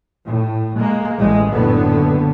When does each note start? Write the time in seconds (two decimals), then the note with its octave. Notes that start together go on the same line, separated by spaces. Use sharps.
0.25 A2
0.80 G#3 A#3
1.19 A1 G#3
1.51 F#1 A2 D3 B3